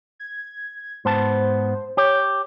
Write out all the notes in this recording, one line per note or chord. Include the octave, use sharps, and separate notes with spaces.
G#6
G#2 B3 C5 A5
G4 C#5